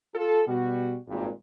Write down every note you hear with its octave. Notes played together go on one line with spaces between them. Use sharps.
F4 A4
B2 G3 F#4
G#1 G2 A#2